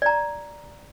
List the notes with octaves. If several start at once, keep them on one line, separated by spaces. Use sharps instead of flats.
D5 A#5